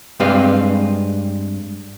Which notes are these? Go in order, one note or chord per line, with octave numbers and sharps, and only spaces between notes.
G2 G#3 C4 G4 B4 F5